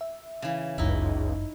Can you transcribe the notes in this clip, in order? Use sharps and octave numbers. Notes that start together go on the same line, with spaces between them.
E5
C#3 E3
G1 C#2 F#2 D#4 E4